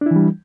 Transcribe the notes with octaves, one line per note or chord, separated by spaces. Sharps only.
E3 G3 D4 E4